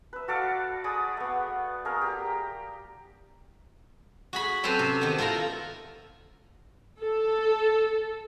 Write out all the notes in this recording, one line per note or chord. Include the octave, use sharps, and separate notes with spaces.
B4 E5
F#4 A4 D5 F5
G#4 D5 B5 D#6
A3 B3
A3 G#4 A#4 F5
G4 A#5
F#4 G#4 B5
F#3 C4 C#4 A4 B4 C5
C3
D#3 B3
E4 F4 A4 A#4 A#5
A4